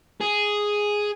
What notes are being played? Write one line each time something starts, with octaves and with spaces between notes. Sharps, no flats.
G#4